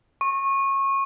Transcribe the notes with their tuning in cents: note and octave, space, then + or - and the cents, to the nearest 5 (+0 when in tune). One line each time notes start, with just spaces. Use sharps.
C#6 -25